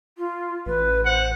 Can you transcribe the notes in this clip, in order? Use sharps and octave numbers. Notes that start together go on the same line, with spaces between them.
F4
A1 B4
C5 F#5